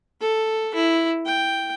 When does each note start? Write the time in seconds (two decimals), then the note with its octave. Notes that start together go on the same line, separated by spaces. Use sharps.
0.21 A4
0.74 E4
1.26 G5